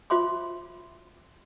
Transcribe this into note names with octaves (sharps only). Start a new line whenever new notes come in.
F4 C5 E5 C6 D6